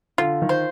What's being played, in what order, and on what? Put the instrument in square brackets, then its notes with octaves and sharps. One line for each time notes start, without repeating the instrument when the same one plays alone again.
[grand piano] D3 [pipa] F4
[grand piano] D#3
[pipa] C5